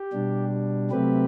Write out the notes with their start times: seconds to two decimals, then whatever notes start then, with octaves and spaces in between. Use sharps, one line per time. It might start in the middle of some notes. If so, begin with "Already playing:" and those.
Already playing: G4
0.13 B2 G3 D4
0.91 C3 F#3 A3 C4 G4 B4